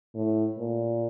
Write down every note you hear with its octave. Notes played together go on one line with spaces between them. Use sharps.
A2
A#2